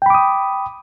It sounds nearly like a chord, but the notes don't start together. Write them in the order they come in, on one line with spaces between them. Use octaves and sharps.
G5 B5 D6 D#6